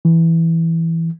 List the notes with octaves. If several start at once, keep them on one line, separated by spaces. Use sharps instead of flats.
E3